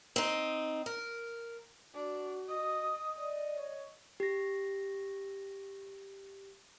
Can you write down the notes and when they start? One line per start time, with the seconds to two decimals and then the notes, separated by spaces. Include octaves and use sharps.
0.16 C4 D#4
0.86 A#4
1.94 D4 F#4
2.48 D#5 D#6
3.17 D5 D#5
3.54 C#5
4.20 G4 A#6